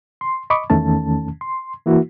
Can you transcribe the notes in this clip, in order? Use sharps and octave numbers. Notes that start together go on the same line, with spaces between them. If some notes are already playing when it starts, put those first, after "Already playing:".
C6
D#5 B5 C#6 D6
E2 D#3 A3 C#4 A5
C6
E3 A#3 E4 F#4